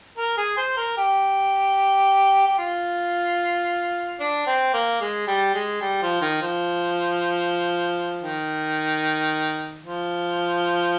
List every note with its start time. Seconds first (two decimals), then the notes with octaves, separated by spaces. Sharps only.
0.18 A#4
0.37 G#4
0.57 C5
0.77 A#4
0.97 G4
2.47 G4
2.58 F4
4.20 D4
4.47 C4
4.74 A#3
5.01 G#3
5.27 G3
5.55 G#3
5.81 G3
6.02 F3
6.21 D#3
6.42 F3
8.23 D#3
9.85 F3